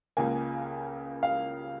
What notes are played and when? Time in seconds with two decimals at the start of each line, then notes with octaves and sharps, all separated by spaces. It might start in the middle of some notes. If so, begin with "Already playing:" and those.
0.17 C#2 C#3 A#3 G#5
1.23 F5